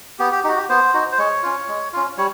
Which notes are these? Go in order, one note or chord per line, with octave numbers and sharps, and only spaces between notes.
B3 G4
G4
D#4 F#4 G4
G4
B3 C5
D#4 F#4
C5
G#3 C#5
C#4 F4
G#3
C#4 F4
G3 C#5